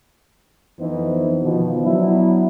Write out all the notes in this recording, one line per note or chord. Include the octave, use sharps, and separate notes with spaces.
F2 E3 B3 D#4 C5
B2 D#3 F3
F#3 B3 D4 E4